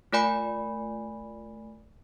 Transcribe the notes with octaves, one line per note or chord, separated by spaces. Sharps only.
A3 F4 A#4 D5 G#5 B5